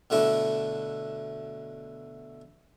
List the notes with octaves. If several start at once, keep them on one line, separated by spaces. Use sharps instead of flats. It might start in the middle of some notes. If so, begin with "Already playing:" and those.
B2 D3 A3 D4 E4